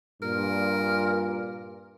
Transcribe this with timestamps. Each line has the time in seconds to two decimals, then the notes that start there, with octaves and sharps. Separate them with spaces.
0.22 G2 A#2 A#4